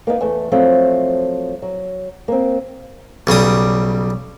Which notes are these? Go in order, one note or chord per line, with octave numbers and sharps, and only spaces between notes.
A#3 B3 D#4
E2 A3
F3 F#3 A3 C4
F#3
A#3 C4
B1 C#3 G3 D#6